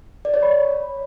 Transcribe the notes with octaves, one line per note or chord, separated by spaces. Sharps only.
D5
C#5
B5